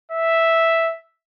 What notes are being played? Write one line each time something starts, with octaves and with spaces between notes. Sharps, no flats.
E5